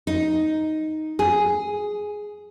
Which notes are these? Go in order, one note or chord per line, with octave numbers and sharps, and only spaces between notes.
D#4
G#4